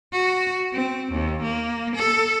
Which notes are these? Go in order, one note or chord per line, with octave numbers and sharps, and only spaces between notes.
F#4
C4
D#2
A#3
A4